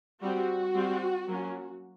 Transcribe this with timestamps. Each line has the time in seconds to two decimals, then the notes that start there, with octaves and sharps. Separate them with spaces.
0.22 G3 C4 F#4
0.75 G3 C4
1.28 F#3 A#3 C#4